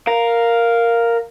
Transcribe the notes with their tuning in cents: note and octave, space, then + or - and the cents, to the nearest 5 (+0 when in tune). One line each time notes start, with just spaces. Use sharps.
A#4 +0 F5 +0